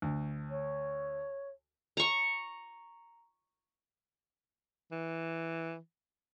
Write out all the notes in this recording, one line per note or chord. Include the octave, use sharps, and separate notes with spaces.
D2
C#5
A#5 C#6
E3